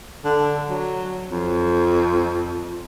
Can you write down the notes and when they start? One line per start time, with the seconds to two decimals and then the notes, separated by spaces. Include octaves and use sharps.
0.25 D3
0.68 F#3
1.30 F2